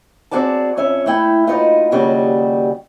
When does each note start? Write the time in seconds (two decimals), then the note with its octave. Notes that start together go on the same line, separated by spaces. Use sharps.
0.31 C4 F#4 G#4 D5 A5
0.77 F2 C#4 E5
1.06 A3 E4 G5
1.47 D#4 F4 F#4 B4 D#5
1.91 D#2 A#2 C#3 G3 F#4 D#5